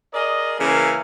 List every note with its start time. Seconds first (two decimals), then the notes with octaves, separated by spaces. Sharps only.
0.14 G#4 A#4 D5 D#5
0.59 C#3 E3 A#3 A#4